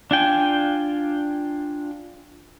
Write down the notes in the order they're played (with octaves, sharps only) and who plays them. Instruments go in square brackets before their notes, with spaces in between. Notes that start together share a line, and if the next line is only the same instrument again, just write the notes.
[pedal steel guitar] D4 F4 G5 G#5